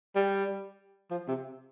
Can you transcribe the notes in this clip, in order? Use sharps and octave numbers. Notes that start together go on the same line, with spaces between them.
G3
F3
C3